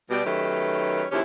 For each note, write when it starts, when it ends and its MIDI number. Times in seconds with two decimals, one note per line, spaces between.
0.09 0.26 47
0.09 0.26 55
0.09 0.26 67
0.26 1.04 51
0.26 1.04 54
0.26 1.04 57
0.26 1.04 61
0.26 1.04 67
0.26 1.04 71
1.11 1.20 39
1.11 1.20 49
1.11 1.20 53
1.11 1.20 61
1.11 1.20 64
1.11 1.20 67